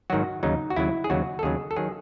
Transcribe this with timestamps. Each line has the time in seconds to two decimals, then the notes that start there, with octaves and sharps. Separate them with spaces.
0.10 G#2 D#3 F#3 F#4
0.43 D#2 C#3 F#3 D#4
0.70 F#4
0.76 D#2 C#3 F#3 E4
1.04 G#4
1.10 D#2 C#3 F#3 F#4
1.39 A4
1.43 D#2 C#3 F#3 G#4
1.71 A4
1.76 D#3 F#3 G#4